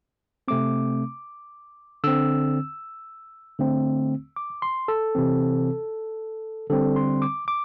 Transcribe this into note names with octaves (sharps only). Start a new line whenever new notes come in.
C3 A3 C4 D6
D3 C4 E6
D3 A3 C4
D6
C6
A4
C3 E3 C4
D3 G3 C4 A4
C6
D6
D6